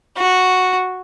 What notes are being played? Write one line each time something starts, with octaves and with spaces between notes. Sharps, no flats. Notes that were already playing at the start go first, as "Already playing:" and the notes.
F#4